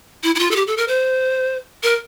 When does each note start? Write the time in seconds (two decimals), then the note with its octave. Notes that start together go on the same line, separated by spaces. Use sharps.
0.23 E4
0.35 E4
0.39 F4
0.51 A4
0.56 G4
0.67 A4
0.77 A#4
0.88 C5
1.83 A#4